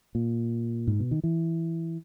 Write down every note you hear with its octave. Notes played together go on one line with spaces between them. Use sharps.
A#2
G#2
B2
D#3
E3